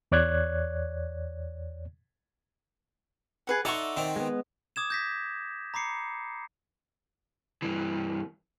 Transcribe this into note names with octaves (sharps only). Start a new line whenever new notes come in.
E2 C#5 D5 F#6 G#6
G#4 B4 F#5
D#4 A4 D5 E5 F#5 C6 C#6
D#3 C4
G#3 B3
D6 D#6 G#6 E7
G6 A#6 B6
A#5 B5 D6 C7 C#7
G2 E3